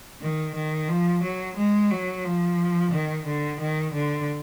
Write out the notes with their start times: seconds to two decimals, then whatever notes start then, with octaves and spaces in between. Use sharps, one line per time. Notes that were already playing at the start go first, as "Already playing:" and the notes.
0.21 D#3
0.55 D#3
0.89 F3
1.23 F#3
1.57 G#3
1.91 F#3
2.24 F3
2.92 D#3
3.26 D3
3.60 D#3
3.94 D3